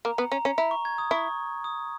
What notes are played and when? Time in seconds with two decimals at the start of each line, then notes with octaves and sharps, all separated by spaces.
0.05 A#3 A#5
0.18 B3
0.32 C#4 A#5
0.45 C#4
0.58 E4 A#5
0.71 C#6
0.85 G#6
0.98 D#6
1.11 E4 C#6
1.64 D#6